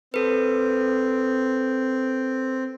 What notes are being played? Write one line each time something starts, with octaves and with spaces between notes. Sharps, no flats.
C4 A4 B4